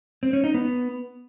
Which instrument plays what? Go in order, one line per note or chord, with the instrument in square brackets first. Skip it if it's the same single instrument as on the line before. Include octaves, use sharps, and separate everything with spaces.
[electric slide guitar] C4
C#4
D#4
B3